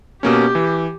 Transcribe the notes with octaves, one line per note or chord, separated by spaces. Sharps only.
B2 A#3 C#4 G4
E3